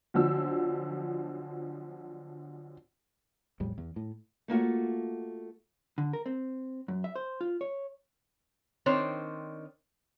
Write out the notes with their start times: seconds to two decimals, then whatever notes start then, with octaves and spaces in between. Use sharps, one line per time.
0.14 B1 D3 F3 E6
3.60 A#1 E2 A2 G3
3.78 E2
3.96 A2
4.48 A3 A#3 F4 F#4
5.98 D3
6.13 A#4
6.26 C4
6.88 F#2
7.04 E5
7.16 C5
7.41 F4
7.61 C#5
8.86 D#3 C4 D4 C5 C#5